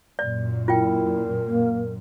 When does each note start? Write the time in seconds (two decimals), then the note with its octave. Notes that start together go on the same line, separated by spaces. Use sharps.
0.19 F#2 A#2 D5
0.68 E4 F4 A#4 G5
1.44 A#3